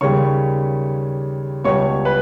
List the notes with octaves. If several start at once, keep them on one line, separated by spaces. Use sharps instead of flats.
D#2 C#3 G3 C#5 C#6
C#2 B2 G3 C#5 C#6
B4 B5